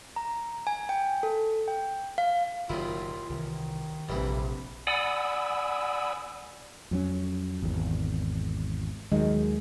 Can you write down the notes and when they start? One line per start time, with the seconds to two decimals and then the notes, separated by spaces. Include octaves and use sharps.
0.16 A#5
0.67 G#5
0.89 G5
1.23 A4
1.68 G5
2.18 F5
2.69 F#1 D#2 A#2 D#3 E4 F4
3.29 C2 D#3 E3
4.09 F1 A#1 G2 C3 E3
4.87 D5 F#5 G#5 B5 D#6 E6
6.91 F2 F#3 C#4
7.62 G#1 E2
9.12 D#2 D#3 F#3 G#3